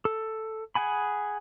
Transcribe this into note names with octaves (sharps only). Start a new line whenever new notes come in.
A4
G#4 F#5 G#5 B5